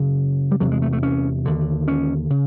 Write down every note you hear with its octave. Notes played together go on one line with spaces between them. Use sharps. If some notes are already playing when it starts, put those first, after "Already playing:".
Already playing: F#2 C#3
G3
E2 C3 F#3
G#3
A3
A3
C#4
D#2 D3
C#4
C#3